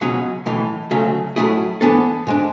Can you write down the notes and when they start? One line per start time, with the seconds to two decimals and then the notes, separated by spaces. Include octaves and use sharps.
0.01 C#2 B2 F#3 C#4 G#4
0.46 B1 A2 E3
0.91 D2 C#3 F#3 A3
1.36 A2 F#3 A3 E4 G#4
1.81 G#2 E3 B3 D4 A4
2.27 G#2 G#3 D4